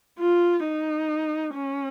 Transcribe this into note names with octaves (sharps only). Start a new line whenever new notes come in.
F4
D#4
C#4